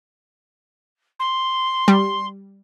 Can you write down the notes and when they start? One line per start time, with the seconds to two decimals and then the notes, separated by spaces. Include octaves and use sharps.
1.19 C6
1.88 G3